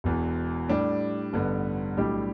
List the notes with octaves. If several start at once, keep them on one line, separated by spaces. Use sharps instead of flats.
E1 E2 E3
A2 G3 D4 G4 D5
A1 G2 D3 B3
B1 A2 G3 D4 G4